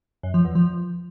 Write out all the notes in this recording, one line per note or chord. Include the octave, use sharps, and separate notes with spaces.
F#2
F3
E2
F3